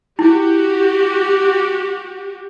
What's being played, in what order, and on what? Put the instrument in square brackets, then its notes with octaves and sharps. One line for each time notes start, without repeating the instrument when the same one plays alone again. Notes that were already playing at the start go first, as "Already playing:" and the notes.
[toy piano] E4 [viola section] F#4 G4